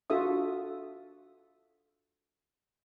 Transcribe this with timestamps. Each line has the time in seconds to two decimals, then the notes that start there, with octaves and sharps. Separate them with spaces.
0.10 D4 F4 F#4 A4 E5 D#6